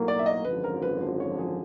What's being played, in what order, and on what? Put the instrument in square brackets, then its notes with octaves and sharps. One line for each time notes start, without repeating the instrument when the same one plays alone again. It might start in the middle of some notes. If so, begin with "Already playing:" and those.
Already playing: [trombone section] B1 A2 F#3 A#3
[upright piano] D5
E5
D#5
[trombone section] G#1 F#2 D3 F3 [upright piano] B4
[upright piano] A#4
B4
C5
C#5
G#4